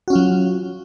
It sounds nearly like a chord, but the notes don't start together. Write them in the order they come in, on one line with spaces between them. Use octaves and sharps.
F#4 C#4 F4 F#3